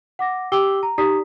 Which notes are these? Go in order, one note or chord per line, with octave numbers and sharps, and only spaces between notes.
F#5 D6 A#6
G4 G5 D6 E6 G7
A#5
D#4 G4 D5 A#5 D#6 B6